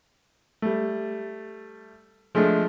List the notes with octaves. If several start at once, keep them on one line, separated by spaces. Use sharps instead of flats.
G3 A3
F3 G#3 A3 D4